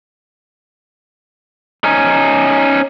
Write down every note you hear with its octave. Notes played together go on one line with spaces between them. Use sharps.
C#4 D#4